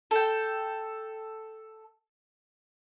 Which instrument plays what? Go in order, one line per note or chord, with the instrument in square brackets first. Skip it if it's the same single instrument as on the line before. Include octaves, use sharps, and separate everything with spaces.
[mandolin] A4 G5